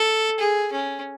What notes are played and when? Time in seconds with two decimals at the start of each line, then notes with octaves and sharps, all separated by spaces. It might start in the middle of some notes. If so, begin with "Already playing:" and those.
Already playing: A4
0.39 G#4
0.72 C#4